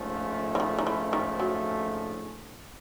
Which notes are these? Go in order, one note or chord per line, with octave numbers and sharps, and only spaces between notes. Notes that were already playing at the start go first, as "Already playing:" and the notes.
Already playing: A#1 G#2 F3 A3 C#4
E3
D#3
D#3
E3
D#3
F#3